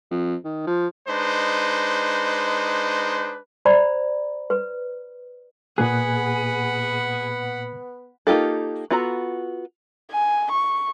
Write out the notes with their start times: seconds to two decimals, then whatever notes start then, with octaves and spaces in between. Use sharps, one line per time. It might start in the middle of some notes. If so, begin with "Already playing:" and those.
0.11 F2
0.44 D#3
0.67 F3
1.08 G#3 D4 D#4 B4 C5
3.65 C5 D5 A#5 B5
4.50 B4
5.78 A#2 A#3 B3 G#4 F#5 B5 F#6
8.27 A#3 D#4 F4 G4 A4
8.91 B3 F4 F#4 A4 A#5
10.11 G#5
10.51 C#6